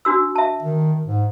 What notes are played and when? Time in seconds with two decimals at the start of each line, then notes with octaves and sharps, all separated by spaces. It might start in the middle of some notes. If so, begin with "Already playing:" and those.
0.05 D4 F#4 E6
0.36 E5 A5
0.62 D#3
1.07 G#2